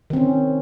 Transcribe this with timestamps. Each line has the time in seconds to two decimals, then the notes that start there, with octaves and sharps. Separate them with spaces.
0.10 D#3
0.13 C4
0.16 C#4